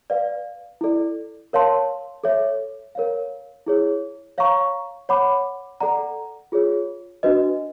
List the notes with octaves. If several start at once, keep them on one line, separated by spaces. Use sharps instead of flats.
B4 D5 F5
E4 A4 D5
A#4 C#5 F5 A5 C6
A4 C#5 E5
A#4 C#5 F5
E4 G#4 C#5
C#5 F5 A#5 C#6
C#5 F#5 B5 D6
A4 D5 F#5 A#5
F4 G#4 C#5
D4 F#4 B4 D#5